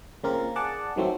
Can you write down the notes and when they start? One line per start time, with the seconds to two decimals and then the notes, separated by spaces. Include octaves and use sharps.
0.24 C#3 A#3 C4 F4 A#4
0.56 G#4 D5 F#5 A5
0.96 D#3 E3 F#3 A3 C4 A4